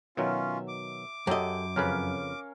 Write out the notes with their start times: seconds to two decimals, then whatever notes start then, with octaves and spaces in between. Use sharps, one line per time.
0.17 B2 D#3 F#3 C#4 F4 E5
0.68 D6
1.27 F#2 G4 A4 D#5
1.76 F2 C#3 C#4 A#4 B4 F5